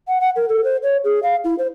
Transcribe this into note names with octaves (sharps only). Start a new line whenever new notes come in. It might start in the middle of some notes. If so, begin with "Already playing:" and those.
F#5
F#5
A#4
A4
C5
C#5
G#4
F5
E4
C5